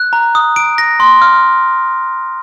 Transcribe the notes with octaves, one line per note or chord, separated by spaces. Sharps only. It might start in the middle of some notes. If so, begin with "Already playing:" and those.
Already playing: F#6
A#5
D#6
D7
A#6
C6
F6